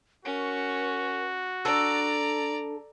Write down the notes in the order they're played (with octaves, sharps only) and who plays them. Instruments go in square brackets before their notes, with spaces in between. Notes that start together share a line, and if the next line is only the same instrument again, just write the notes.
[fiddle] C#4 [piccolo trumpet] F#4 [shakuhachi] A#4
[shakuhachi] D4 [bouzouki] A4 [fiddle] D5 A#5